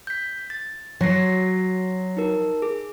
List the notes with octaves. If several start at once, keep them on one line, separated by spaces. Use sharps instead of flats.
G6 B6
A6
F#3 F#4 A#6 C7
D#4 A#4
G#4